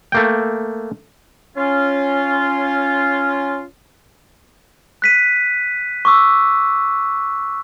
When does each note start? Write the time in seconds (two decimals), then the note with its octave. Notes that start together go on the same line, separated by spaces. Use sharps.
0.12 A3 A#3 G5
1.56 C#4 F4
5.02 F#6 B6 D#7
6.05 C#6 D6 E6